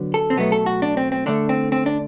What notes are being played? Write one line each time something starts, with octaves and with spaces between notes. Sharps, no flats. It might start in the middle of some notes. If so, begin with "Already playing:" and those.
Already playing: D3 F#3 B3
A4
C4
B2 F#3 A3 B3
A4
F#4
D4
C4
C4
D3 A3 D4
C4
C4
D4